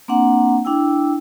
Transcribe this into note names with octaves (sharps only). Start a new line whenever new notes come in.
A#3 C4 D4 F#5 A#5
D4 E4 G5 E6